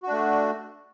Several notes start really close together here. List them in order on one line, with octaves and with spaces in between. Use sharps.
F#4 D4 A3